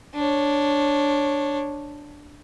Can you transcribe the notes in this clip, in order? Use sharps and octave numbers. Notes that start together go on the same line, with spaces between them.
D4 C#5